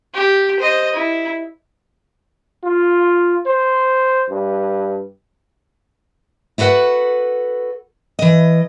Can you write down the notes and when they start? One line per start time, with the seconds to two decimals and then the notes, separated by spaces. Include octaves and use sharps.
0.14 G4
0.60 C5 D#5
0.93 E4
2.64 F4
3.46 C5
4.30 G2
6.58 E4 F#4 A4 B4 F#5
8.19 E3 D#5